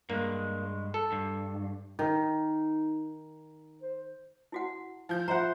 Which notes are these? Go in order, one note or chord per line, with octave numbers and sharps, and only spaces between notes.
G2 G#3 A#3
A4
G2
D#3 D#4
C5
E4 F#4 F#5
F3 G6
F4 C5 E5 F#5 A#5